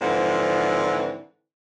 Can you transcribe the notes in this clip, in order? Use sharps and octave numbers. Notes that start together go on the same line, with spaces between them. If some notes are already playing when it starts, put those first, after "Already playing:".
G#2 D3 E3 F3 C4